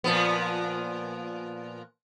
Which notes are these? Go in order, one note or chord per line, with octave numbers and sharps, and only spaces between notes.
A#2 F3 B3